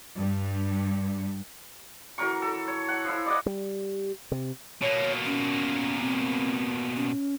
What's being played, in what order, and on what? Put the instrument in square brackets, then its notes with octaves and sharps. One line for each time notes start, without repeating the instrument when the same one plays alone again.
[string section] G2
[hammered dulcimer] E3 F#3 A#4 C#6
A4
C#5
F#5
F3 E4
D5 D#5 F#5
[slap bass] G3
C3
[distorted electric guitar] B2 A#3 [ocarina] C#5
[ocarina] C#4
C4
C#4